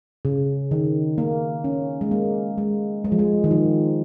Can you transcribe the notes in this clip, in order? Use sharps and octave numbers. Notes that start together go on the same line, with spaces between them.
C#3
D#3
A#3
C#4
G#3
A#3
G#3
G#3
F3
G#3
D#3
F3